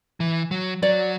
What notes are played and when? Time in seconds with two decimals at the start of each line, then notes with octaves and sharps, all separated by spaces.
0.20 E3
0.51 F#3
0.82 F#3 D5